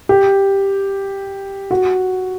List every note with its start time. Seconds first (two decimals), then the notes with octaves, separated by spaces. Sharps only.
0.09 G4
1.71 F#4